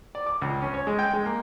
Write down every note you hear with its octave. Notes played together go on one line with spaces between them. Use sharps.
D5
D6
C#2
C#4
C#5
G#3
G5
G#3
A#3